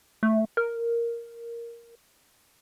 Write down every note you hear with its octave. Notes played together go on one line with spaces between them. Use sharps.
A3
A#4